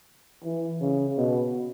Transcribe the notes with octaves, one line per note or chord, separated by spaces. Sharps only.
E3
C#3
B2